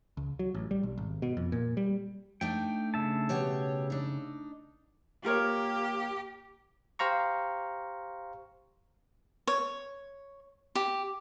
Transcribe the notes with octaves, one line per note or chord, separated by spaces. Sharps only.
C#2
F#3
A1
G3
B1
G#1
B2
F2
A#2
G3
A3 D4 D#4 G5
C#3 E5 A5
B2 G4 C#5
D4 D#4
A#3 F4 G4 A#4 C#5
G4 C5 F5 A#5 C#6
C#5
G4